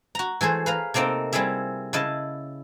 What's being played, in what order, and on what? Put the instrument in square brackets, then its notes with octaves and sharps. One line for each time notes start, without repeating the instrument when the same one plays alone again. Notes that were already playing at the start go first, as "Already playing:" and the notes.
[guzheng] F#4 A#5
E3 A3 G#4 C5
B4 F5 A#5
C3 A3 A#3 C4 D#4
G3 C4 E4 G#4 E5
C#3 E4 D#5 A5